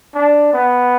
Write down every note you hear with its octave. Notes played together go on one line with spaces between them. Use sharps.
D4
B3